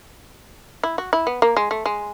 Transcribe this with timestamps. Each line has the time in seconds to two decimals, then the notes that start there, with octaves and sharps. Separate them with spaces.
0.83 E4
0.98 F#4
1.13 E4
1.27 B3
1.42 A#3
1.57 G#3
1.71 A3
1.86 G#3